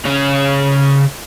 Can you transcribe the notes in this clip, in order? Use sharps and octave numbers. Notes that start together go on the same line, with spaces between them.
C#3 C#4